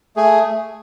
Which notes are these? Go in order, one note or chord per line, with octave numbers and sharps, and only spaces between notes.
A3 G#4